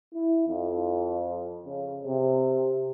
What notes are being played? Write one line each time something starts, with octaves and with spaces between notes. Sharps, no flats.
E4
F2
C#3
C3